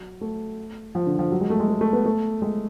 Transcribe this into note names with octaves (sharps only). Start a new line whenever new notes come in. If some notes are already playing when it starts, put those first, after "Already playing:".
Already playing: F#3
A3
F3
D3
F3
F#3
G#3
A3
G#3
A3
A3
B3
A3
G#3